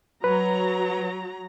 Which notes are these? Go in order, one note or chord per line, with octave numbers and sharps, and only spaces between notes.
F#3 B4 A#5